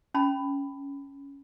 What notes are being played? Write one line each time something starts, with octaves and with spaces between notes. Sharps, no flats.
C#4 A5 B5